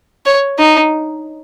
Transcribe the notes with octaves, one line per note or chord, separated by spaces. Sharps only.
C#5
D#4